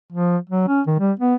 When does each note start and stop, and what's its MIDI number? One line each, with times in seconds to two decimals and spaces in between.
0.12 0.37 53
0.49 0.67 54
0.67 0.81 61
0.87 0.96 51
0.99 1.12 55
1.19 1.35 59